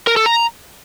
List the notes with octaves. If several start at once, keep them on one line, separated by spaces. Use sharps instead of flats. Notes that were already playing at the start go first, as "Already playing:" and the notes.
A#4
A4
A#5